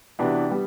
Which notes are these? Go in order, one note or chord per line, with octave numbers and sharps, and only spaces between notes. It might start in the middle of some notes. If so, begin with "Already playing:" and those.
C3 E3 B3 D4 F#4
G3 B3